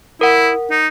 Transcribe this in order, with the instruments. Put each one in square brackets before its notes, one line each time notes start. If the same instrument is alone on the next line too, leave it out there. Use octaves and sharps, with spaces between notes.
[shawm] E4 [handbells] A#4 F#5
[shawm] D#4